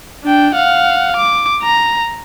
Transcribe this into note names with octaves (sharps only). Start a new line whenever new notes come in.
D4 G5
F5 F#5
D6
A#5